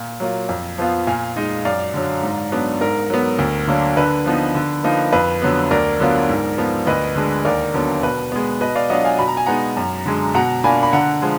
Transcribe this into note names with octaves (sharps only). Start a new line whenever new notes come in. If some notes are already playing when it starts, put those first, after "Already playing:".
Already playing: A#2
F#3 A#3 F4
F2
F3 B3 F4
A#2 F5 G#5
G#3 D#4
F#2 D5 F5
D3 F#3
G#2
F#3 B3 D4
G#2 A#4
F#3 B3
D2
D3 F#3 A#3 D4
D3 B4
F3 B3 D#4
D3
F3 A#3 D#4
F2 B4
D3 F#3 B3
D2 A#4 D5
D3 F#3 B3 F4
G#2
F3 B3
D2 B4 D#5
D3 G#3 D4
D#2 A#4 D5
D3 F#3 B3
B2 B4
G#3 B3
B2 B4 D#5
D5 F5
F#3 B3 D4 F4 D#5 F#5
F5 G#5
B2 B5
A#5
G#5
G#3 B3 D#4 F#5 A#5
F#2
D3 G#3
B2 F#5 A#5
A#3 D4 F4 G#5 B5
B5
D3 F#5 A#5
F3 G#3